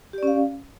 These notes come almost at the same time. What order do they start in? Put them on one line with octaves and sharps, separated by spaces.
G4 D5 C#4 F5